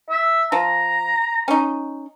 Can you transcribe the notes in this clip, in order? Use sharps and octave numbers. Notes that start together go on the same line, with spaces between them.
E5
F3 A#5
C#4 D#4